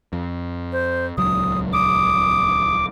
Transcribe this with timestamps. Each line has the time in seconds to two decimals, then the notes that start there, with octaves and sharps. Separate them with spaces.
0.13 F2
0.72 C5
1.18 D#1 C#2 F#3 D#6
1.73 D6 D#6